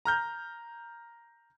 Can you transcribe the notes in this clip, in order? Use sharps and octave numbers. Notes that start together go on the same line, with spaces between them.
A#5 F6 G6